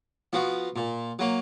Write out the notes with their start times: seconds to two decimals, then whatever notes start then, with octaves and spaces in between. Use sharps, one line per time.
0.33 F3 B3 F#4
0.76 A#2
1.19 F#3 A#3